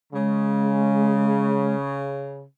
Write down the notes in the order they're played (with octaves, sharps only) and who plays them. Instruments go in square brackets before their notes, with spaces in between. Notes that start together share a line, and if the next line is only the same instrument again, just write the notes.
[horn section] C#3 [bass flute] G#3